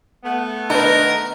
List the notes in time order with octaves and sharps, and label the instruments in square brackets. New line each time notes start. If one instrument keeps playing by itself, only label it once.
[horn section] A3 B3
[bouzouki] D#3 [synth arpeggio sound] D4 B4 [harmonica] A#4